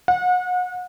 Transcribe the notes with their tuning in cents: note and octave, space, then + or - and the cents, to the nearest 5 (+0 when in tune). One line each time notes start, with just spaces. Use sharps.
F#5 -35